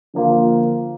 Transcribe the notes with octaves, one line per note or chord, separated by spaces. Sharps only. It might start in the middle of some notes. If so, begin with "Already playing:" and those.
D3 F3 A#3 F4